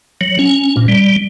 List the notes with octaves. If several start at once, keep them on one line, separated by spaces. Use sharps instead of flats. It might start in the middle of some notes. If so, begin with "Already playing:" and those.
F#3
C#4
A#2
G3